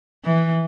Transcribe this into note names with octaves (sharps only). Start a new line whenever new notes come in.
E3